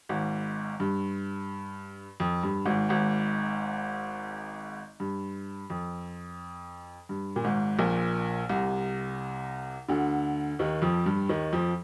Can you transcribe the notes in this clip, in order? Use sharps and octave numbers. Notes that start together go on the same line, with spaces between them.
G#1 G#2
G2
F2
G2
G#1 G#2
G#1 G#2
G2
F2
G2
A#2
G#1 G#2
A#1 A#2
C2 C3
D2 D3
D#2 D#3
F2 F3
G2 G3
D#2 D#3
F2 F3